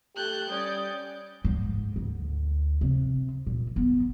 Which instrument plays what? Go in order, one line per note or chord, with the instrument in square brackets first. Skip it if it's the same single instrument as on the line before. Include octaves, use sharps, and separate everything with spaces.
[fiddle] A3 F#6 [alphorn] G4 [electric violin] G6
[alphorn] G3 [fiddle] C#4 D5 [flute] D#6
[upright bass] G#2
D2
C3
A#2
B3